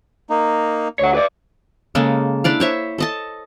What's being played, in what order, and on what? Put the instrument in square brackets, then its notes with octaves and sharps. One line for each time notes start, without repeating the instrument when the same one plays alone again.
[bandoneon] A#3 D#4
[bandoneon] D2 [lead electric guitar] C#5 F#5
[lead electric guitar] B4 D5
[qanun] C#3 G#3 A#3 A4
D4 E4 D5 F5
C5 C#5 E5
A4 D#5 A5